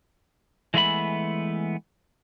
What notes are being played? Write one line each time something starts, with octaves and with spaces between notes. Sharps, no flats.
E3 G#3 A3 B3 E5 B5